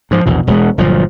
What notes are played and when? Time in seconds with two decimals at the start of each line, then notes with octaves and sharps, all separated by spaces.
0.11 G#2 F3
0.26 A#1 E2 B2
0.47 E1 B2 G#3 B3
0.78 G1 A#2 F3 F#3